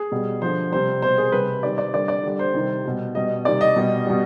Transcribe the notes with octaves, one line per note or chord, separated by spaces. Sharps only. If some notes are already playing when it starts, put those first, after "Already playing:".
Already playing: G#4
B2 G3
D3 F3 C5
C3 G3 C5
B2 G3 C5
G#4
C3 G3 B4
C3 D#3 G3 D5
D5
D3 G3 D5
D5
D3 G3
C5
C3 D#3 G3
B2 G3
B2 G3 D#5
C3 D#3 G3 D5
D#5
B2 G3
B2 G3